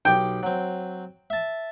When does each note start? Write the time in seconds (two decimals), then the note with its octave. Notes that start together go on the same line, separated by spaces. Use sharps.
0.05 B1 G4 G5
0.43 F#3 C4
1.30 E5 A5